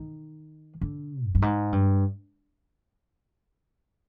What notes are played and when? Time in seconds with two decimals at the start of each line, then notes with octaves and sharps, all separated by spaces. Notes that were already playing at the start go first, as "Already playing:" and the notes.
Already playing: D#3
0.81 D3
1.27 F2
1.35 G2
1.42 G#2
1.72 G2